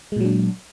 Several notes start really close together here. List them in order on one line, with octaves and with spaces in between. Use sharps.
G#3 A#2 F#3 D4